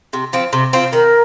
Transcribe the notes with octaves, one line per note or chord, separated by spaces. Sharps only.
C3
F3 C4
C3
F3 C4
D#3 A#4